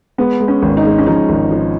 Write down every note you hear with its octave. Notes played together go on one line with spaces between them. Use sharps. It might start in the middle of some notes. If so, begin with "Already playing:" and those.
G#3 B3
G#3
C#4
G#1
D#4
G#3
C#4
F3 D#4
G#1
F3